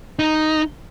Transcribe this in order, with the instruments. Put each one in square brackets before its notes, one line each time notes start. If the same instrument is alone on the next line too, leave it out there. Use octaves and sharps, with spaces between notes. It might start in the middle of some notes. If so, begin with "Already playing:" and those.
[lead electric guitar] D#4